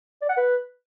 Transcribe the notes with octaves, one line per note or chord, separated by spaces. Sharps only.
D5
F#5
B4